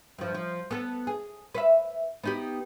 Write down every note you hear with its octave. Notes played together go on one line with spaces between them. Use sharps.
G2 F3
F3
B3 A4
G#4
B4 C#5 E5
B3 D#4 G4